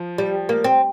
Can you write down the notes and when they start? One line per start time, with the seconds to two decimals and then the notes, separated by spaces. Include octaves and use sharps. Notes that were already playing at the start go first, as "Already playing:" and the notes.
Already playing: F3
0.18 G3
0.49 A#3
0.64 C4